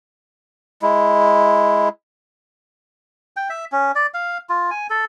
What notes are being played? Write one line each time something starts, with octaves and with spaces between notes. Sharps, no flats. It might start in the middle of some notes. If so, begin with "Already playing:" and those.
G#3 E4
G5
E5
C#4
D5
F5
F4
G#5
A4